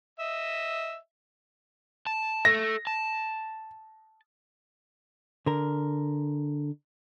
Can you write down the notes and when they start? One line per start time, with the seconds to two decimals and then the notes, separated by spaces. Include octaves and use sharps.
0.20 D#5 E5
2.07 A5
2.45 A4 E5 A#6
2.87 A5
5.46 D3 A#4